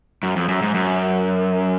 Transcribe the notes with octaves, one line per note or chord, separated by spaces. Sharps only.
F#2
F2
F#2
G#2
F#2